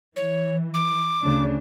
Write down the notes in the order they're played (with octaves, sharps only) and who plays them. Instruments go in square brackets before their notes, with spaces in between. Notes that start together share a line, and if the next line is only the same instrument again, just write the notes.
[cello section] E3 [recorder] C#5
[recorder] D6
[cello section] D2 C#3 D4